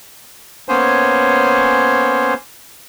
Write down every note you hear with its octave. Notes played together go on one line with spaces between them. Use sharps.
A#3 B3 C#4 C5 C#5 G#5